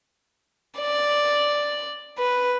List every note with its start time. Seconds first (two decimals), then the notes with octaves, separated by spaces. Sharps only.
0.79 D5
2.19 B4